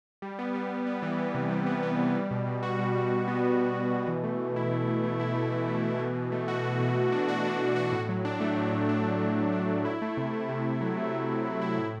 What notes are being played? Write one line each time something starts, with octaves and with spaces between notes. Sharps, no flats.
G3
B3
G3
B3
B3
E3
B3
C3
G3
B3
B3
E3
G3
B2
B2
F#4
G3
G3
B2
B3
B3
G3
F#4
B2
E3
A3
E3
E4
A3
A3
A3
E4
A3
E3
A3
E3
B2
B2
A3
F#4
A3
B2
B2
D4
F#4
D4
D4
F#4
A2
F#3
D4
A3
F#3
A2
D4
F#3
F#3
A2
D4
F#3
E4
A3
C3
A3
C3
C3
F#3
A3
F#3
C3
F#3
E4
A2